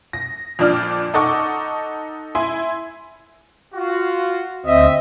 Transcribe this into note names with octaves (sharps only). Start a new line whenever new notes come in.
A#6
F2 A#2 D4 D5 F6
D#4 A4 F#5 C#6 D6
E4 G#5 C6
F4 F#4
D2 C4 D#5 E5